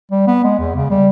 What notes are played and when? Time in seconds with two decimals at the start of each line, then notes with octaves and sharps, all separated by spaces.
0.12 G3
0.27 B3
0.44 G#3
0.59 E2
0.76 C#3
0.90 G3